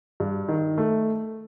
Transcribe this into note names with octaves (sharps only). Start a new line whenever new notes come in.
G2
D#3
A3